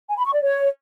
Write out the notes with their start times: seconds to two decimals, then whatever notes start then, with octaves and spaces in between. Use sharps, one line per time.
0.09 G#5
0.17 B5
0.26 C#6
0.34 D5
0.42 C#5